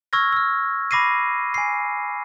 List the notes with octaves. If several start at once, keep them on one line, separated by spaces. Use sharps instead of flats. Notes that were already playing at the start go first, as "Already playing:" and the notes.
C#6 E6 F6 G#6 A#6
E6 F6
B5 D6 A#6 C7 D#7
G#5 C7